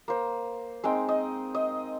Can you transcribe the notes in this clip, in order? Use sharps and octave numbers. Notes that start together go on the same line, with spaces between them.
A#3 C5
G#3 C4 D#4 G5
D#5
D#5